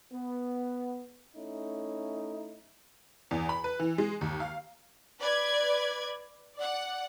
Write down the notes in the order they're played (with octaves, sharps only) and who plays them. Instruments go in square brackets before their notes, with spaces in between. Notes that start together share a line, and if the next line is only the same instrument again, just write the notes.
[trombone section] B3
A3 C#4 D#4 E4
[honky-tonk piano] E2
B5
B4
E3
G#3
D#2
F5
[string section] B4 D5 G#6
D5 F#5